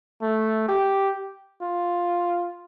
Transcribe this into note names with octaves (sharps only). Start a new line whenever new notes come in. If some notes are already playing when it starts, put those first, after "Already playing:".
A3
G4
F4